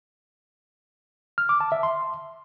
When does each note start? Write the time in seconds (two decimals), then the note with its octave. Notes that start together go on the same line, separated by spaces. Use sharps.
1.38 F6
1.49 D6
1.60 A5
1.72 E5
1.83 C6